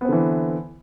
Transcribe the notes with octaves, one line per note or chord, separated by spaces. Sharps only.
D3 E3 B3 C4